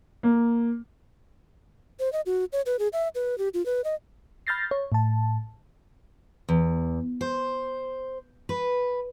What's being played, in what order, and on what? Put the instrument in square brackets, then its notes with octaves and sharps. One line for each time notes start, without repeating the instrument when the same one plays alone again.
[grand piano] A#3
[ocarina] C5
D#5
F#4
C#5
B4
G#4
E5
B4
G4
F4
B4
D#5
[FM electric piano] B5 F6 G6 A6 A#6 C7
C#5
A2 A5
[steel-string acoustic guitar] E2
C5
B4